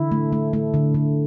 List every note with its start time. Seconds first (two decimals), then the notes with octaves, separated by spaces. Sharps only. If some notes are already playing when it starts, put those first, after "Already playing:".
Already playing: D3 E4
0.12 A3
0.33 A3
0.53 A3
0.74 D3
0.94 D3